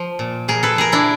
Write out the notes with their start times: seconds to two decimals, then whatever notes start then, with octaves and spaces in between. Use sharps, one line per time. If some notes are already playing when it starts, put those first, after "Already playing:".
Already playing: F3
0.19 A#2
0.48 A#2 G#4 A#4
0.63 A4 B4
0.76 A#2 G#4 A#4
0.92 D4 E4